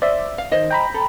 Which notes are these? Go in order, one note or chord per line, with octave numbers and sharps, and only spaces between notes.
C5 D5 E5
F5
D#3 C5 D#5
G5 A#5 B5
A4